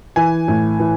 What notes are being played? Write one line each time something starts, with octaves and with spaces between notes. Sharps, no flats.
E3 G#5
A2
E3